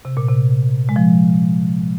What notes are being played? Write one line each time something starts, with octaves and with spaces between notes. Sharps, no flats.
C3
A#2
C3
G#3
F3